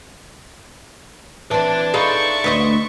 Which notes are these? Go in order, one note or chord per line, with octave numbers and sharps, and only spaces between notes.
E3 C4 D5 A5
D#4 F4 G#4 A4 B4 E5 C#6
D2 B4 C5 D#5